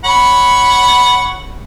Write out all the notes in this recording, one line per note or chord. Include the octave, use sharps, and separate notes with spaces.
C#5 F#5 B5